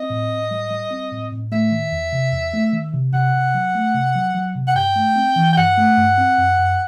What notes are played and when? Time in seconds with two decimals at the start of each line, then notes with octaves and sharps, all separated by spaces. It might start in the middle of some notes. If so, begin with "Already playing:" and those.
Already playing: C4 D#5
0.10 A2
0.31 A2
0.51 G3
0.70 G3
0.91 C4
1.11 A2
1.32 A2
1.52 A3 E5
1.71 D#3
1.92 E2
2.13 C3
2.32 E2
2.54 A3
2.73 D#3
2.94 C3
3.13 C3 F#5
3.35 C3
3.54 F#3
3.75 A3
3.95 C3
4.16 F#3
4.35 F#3
4.55 C3
4.67 F#5
4.75 G2 G5
4.96 A3
5.16 C4
5.36 E3
5.52 G5
5.57 G2 F#5
5.78 A3
5.97 G2
6.18 C4
6.38 F#2
6.59 F#2